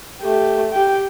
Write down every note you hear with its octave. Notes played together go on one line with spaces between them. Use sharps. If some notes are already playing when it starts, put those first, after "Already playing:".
A3 G4
G4 G5